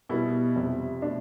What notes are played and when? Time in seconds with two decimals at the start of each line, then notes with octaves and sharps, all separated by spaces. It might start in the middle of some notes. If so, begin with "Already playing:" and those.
0.09 B2 G3 B3 E4
0.56 F2 C3 G3
1.02 B2 A3 D4